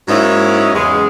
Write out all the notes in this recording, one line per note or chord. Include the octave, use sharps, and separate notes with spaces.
G#2 F#3 A#3 C#4 D#4 E4
E2 C#3 G#3